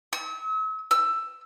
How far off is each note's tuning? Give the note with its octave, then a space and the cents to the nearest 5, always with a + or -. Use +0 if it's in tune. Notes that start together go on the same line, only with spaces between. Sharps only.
E6 -40
E6 +10